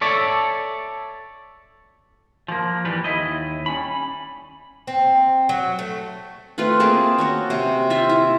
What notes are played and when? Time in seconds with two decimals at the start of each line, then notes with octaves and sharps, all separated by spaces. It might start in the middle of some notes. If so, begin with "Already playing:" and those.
0.01 A4 C#5 D5 E5
2.48 F3 A#3
2.85 E3 G3 G4 B4
3.04 D#2 E4 D#5
3.66 G3 C#4 B5
4.87 C4
5.49 F#3
5.79 A3
6.58 A3 C4 F4 B4
6.80 A#3 C4 G#4 A5
7.18 C#4 F#4 C#5
7.50 C3 C5
7.90 F4 C5 E5
8.09 E4